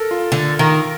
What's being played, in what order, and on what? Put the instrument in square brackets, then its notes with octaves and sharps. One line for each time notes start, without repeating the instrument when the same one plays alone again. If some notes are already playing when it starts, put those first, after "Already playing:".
Already playing: [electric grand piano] A4 A#4
F4
[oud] D3
[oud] D#3 [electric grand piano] A#4